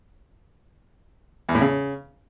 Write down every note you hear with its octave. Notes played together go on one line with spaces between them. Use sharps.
E2
A2
C#3